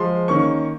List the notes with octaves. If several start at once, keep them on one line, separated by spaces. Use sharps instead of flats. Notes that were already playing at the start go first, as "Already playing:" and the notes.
Already playing: F3 G#3 C6
D#3 A#3 C#4 C#6